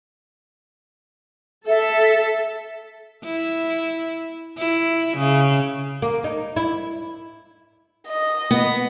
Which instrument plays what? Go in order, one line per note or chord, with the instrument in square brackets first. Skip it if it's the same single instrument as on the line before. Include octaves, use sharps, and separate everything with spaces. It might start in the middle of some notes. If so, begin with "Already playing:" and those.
[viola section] A4 [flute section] E5
[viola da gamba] E4
E4
C#3
[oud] A#3
D#4
E4
[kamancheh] D#5
[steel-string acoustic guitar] B3